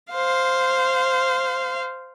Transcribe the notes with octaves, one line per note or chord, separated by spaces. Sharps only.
C5 F5